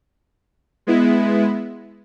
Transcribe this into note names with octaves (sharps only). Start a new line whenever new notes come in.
G#3 B3 E4